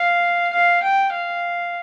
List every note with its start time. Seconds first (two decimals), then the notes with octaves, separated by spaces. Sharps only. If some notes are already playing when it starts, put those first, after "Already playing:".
Already playing: F5
0.53 F5
0.83 G5
1.13 F5